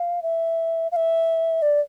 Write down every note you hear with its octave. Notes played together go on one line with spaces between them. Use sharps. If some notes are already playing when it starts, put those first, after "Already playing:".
Already playing: F5
E5
F5
E5
D5